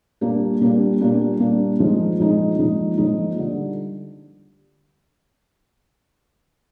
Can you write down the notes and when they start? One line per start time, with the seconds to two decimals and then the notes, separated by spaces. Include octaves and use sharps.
0.21 A#2 G3 A#3 D4
0.60 A#2 G3 A#3 D4
1.00 A#2 G3 A#3 D4
1.40 A#2 G3 A#3 D4
1.79 A#2 F3 G#3 D#4
2.20 A#2 F3 G#3 D#4
2.59 A#2 F3 G#3 D#4
2.97 A#2 F3 G#3 D#4
3.37 D3 G3